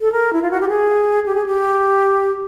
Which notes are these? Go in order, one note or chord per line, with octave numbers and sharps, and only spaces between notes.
A4
A#4
E4
F4
F#4
G4
G#4
G4
G#4
G4